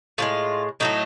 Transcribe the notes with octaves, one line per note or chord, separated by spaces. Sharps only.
A2 F3 G#3 F4
A2 F#3 A3 D#4